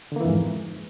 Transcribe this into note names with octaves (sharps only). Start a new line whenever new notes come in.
F2 G#2 D3 E3 A#3